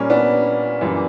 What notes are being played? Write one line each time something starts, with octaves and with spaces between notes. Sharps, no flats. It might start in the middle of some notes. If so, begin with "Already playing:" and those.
Already playing: A#2 G3 A#3 C#4
B3 D4
F#2 E3 G3 A#3